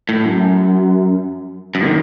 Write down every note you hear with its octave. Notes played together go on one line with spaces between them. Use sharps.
A2
F#2
F#2
D#3